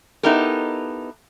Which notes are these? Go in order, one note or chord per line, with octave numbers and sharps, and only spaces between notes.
B3 D#4 E4 G4 A4 A#4